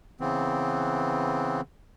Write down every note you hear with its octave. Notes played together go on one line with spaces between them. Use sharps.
C#3 E3 B3 C4